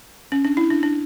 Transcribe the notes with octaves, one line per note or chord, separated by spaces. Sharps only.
C#4
D4
E4
D4
D4